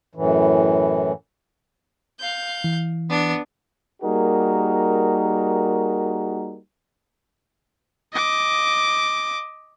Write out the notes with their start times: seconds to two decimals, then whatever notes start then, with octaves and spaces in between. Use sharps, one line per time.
0.15 F#2 A2 E3
2.20 F5 G6
2.64 E3
3.09 B3 D4
4.02 G3 A#3 D#4 F#4 G#4 A#4
8.13 D#5 D6